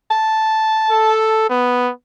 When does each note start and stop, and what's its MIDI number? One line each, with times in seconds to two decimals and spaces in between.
0.11 1.43 81
0.91 1.45 69
1.50 1.91 59